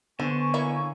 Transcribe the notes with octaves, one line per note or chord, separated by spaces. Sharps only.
D3 B3 C5 G#5 C#6
A#3 E4 C#5